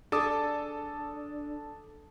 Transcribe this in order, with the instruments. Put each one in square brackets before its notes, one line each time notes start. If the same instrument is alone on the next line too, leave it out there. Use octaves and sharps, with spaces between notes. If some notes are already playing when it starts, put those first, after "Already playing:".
[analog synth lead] D4 [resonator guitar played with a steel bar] G#4 D5 [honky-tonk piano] A4 [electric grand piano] A5 D6 D#6